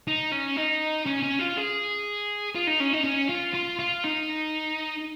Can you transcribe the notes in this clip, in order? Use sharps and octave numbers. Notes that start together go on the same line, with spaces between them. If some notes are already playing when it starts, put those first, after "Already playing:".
D#4
C#4
D#4
C#4
C#4
F4
G#4
F4
D#4
C#4
D#4
C#4
F4
F4
F4
D#4